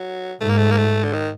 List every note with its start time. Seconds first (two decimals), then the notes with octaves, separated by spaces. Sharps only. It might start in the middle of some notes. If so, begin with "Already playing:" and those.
Already playing: F#3
0.41 G#2 A3
0.49 A#3
0.58 A3
0.71 A#3
0.78 A3
1.03 D3
1.13 D#3